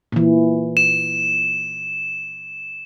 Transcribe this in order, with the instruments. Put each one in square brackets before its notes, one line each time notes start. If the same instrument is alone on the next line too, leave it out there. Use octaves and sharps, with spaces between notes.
[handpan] A#2 E3
[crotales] E7